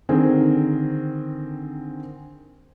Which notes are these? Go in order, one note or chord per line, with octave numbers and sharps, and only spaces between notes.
D3 D#3 C4 G#4 A#4